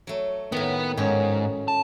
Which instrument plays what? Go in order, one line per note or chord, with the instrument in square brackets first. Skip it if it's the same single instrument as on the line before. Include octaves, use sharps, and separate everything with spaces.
[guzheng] F#3 A3
[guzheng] A2 D#3 [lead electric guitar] B3
[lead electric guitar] G#2 [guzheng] C#4
[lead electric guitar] A5